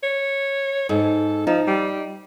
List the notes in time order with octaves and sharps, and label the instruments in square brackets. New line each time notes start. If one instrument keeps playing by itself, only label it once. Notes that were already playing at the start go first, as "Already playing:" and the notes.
[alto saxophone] C#5
[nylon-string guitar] G#2 [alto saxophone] A4
[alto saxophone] F3 [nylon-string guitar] D#4
[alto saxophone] G3